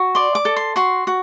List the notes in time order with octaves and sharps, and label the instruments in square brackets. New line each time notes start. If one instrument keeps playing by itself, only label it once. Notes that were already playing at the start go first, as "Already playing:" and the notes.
Already playing: [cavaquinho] F#4
D5 C6
D6
A4
C6
F#4 C6
F#4